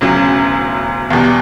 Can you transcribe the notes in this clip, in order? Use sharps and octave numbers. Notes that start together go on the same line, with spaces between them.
E1 D2 C#3 F#3
E2 B2 G3